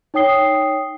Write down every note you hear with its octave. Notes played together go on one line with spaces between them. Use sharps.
D#4 C#5 G5 D#6 C7 G7